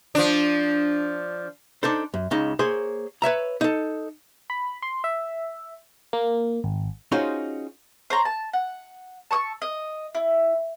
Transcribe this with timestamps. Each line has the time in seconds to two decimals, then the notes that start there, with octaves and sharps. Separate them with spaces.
0.15 F3 D4
1.83 D4 D#4 A4 C5
2.14 F#2
2.31 C#2 C#3 D#4
2.59 A#3 G#4 C5 C#5 C6
3.22 B4 C#5 E5 A#5
3.61 D#4 A4
4.50 B5
4.82 C6
5.04 E5
6.13 A#3
6.64 G#1
7.12 C#4 D#4 F4 F#4 G#4 C5
8.10 C5 C#5 A#5
8.25 A5
8.53 F#5
9.31 A5 C#6 D#6 E6
9.62 D#5
10.15 E4